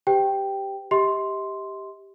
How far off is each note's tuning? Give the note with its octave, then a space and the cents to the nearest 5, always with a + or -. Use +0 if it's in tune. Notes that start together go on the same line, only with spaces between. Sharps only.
G4 +0 B4 +40 G5 +0
G4 +0 D#5 +45 C6 +0